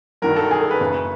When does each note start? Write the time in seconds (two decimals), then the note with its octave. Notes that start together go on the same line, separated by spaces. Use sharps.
0.22 G2 D#3 F#3 A#4
0.36 A4
0.51 G#4
0.61 A4
0.71 B4
0.80 F#1 F#2 C#3